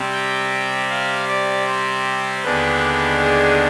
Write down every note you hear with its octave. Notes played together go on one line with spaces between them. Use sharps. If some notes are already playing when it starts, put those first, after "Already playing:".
Already playing: C3 G3 C4
G5
F5
D5
C5
D#2 D3 G#3 B3 D4 B4
G#4